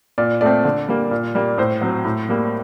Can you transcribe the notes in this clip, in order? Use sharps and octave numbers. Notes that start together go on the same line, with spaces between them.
A#2 D5
A3 C4 D5
D3
G3 A#3
A#2
G3 A#3
A2 C5
F#3 C4
A2
G3 A#3